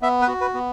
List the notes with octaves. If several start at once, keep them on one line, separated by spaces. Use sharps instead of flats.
B3 E5
B4
F#4
B4
B3